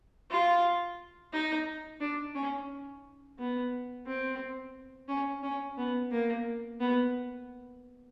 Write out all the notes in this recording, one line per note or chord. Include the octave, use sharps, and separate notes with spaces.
F4
D#4
D4
C#4
B3
C4
C#4
C#4
B3
A#3
B3